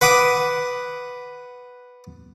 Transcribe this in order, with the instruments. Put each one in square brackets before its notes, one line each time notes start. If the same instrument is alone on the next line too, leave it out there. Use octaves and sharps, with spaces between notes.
[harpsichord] B4 F#5 D6 D#6